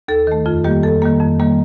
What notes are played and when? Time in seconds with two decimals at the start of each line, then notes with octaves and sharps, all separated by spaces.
0.08 D#2 A4
0.27 D#3 A3
0.46 F2 F4
0.64 D#3 G3 A#3 G4
0.83 F2 A4
1.02 D#3 G3 A#3
1.21 F2
1.40 D#3 G3 A#3